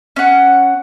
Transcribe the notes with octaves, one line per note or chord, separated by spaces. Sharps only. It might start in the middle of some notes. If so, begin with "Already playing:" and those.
C#4 F#5